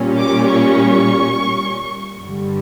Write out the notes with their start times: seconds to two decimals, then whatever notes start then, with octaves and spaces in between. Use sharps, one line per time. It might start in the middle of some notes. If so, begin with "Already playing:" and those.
Already playing: A#2 G3 C#4
0.19 D6
0.52 C#6
2.23 G2 D3 G3